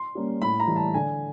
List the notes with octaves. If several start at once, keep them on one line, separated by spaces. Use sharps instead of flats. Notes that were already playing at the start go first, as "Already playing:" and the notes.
Already playing: C6
G3 A#3 C#4
A2 B5
A#5
E3 G3
A5
D3 G#5